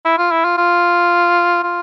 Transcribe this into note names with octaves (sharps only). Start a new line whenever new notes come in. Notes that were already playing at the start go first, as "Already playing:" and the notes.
E4
F4
E4
F4
F4
F4